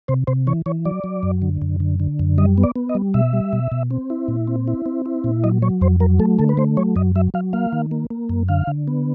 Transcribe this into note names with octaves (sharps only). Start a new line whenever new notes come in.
C3 C5
C3 C5
E3 C#5
E3 C#5
F#3 D5
F#3
F#2
D3
F#2
D3
D3
F#2
G3 D#5
B3
D5
B3
D#5
G3
B2 E5
G3
B2
B2
C4
E4
A#2
C4
E4
C4
E4
A#2
F#3 D#5
F#3 C#5
F2 C5
F#3 A#4
A3 A4
D3 A4
B4
A3 C5
F#3 C#5
F#2 D#5
F#3 E5
F#3 F5
A#3 F5
D#3
A#3
A#3
F#2
D3 F5
D3
B3